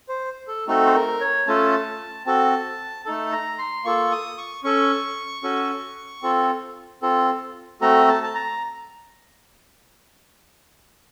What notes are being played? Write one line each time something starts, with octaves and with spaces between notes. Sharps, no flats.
C5
A4
A3 C4 D#4 F#4 A4
C5
A#4
C#5
A3 C#4 F4 A4 A5
C4 F#4 A4 A5
A3 D#4 A4 A5
A#5
C6
A#3 F4 A4 C#6
D#6
C#6
C#4 A4 C#6
C#4 F#4 A4
C4 F4 A4
C4 F4 A4
A3 C4 F#4 A4 A#5
A5
A5
A#5